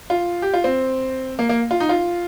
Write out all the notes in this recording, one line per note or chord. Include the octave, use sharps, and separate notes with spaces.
F4
G4
F4
C4
A#3
A#3
F4
D#4
F4